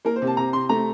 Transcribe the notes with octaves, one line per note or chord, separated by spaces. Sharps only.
A#3 A#4
C5
C3
A5
C3 A#5
C3 C6
A3 A#5